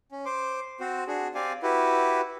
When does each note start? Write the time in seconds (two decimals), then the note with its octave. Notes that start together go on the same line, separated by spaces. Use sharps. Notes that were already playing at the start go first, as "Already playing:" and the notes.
0.12 C#4
0.25 C5 C6 D6
0.80 C4 F#4 C5
1.08 D4 F#4 G#4
1.35 C4 G4 D5 F5 G#5
1.63 E4 F#4 G4 B4